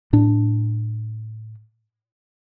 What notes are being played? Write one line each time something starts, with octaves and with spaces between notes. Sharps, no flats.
A2 D4